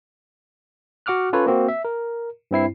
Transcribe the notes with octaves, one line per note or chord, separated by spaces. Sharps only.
F#4 F#5 D6 F6 F#6
C#4 F4 A4 B4 C#5
A#3 C4 F#4
E5
A#4
G2 C4 E4 C7